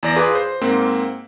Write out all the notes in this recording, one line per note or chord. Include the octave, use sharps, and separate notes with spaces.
E2 D5 A#6
F4 G#4 B4 D6
C5
G#2 A#3 C4